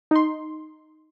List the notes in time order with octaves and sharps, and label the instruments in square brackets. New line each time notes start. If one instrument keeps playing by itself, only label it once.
[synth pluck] D#4 C6